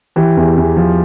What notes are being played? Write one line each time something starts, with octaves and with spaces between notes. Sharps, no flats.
E3 G4
E2
E2
F3